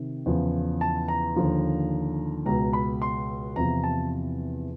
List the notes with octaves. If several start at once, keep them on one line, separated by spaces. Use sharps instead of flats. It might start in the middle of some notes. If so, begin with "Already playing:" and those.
Already playing: C3 D#3
E2 C#3 F3
A5
A#5
D#2 D3 F3
C#2 B2 A#5
B5
C6
E2 C3 F3 A#5
A5